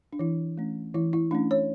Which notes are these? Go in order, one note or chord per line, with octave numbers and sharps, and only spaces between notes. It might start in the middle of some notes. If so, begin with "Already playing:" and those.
D4
E3 E4
A3 C#4
E3 E4
E4
A3 C#4 D4
C#5